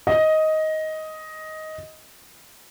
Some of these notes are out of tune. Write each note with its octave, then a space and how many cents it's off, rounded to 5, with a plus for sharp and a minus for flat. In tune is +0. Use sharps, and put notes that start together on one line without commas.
D#5 +10